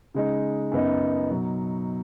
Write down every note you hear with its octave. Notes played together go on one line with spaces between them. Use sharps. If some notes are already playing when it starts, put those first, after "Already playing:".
C#3 G#3 D#4
F#2 C#3 B3 D#4
B2 F#3 D#4